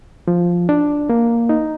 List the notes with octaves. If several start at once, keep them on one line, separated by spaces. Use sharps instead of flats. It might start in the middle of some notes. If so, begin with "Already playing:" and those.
F3
D4
A#3
D#4